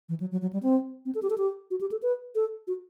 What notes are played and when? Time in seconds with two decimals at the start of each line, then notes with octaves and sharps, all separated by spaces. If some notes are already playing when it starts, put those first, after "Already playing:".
0.09 E3
0.20 F#3
0.32 F#3
0.42 F#3
0.53 G3
0.63 C4
1.06 C4
1.15 A4
1.22 G4
1.30 A4
1.38 G4
1.71 F#4
1.81 G4
1.91 A4
2.02 B4
2.35 A4
2.67 F#4